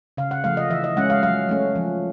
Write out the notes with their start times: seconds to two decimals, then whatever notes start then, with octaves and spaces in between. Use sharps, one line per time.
0.17 C#3 F5
0.31 F#5
0.44 F3 A3 F5
0.57 D#5
0.70 E3 E5
0.84 D#5
0.97 G#3 C#4 F#5
1.10 F5
1.23 F#3 F5
1.49 A3 C#4
1.75 F3